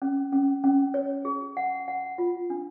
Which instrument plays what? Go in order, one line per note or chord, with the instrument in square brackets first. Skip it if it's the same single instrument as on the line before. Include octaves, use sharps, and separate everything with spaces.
[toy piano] C#4
C#4
C#4
C#5
G#4
F#5
F#5
F4
D4